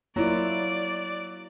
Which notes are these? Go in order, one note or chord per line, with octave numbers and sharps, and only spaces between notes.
F#3 A#3 E4 F4 D5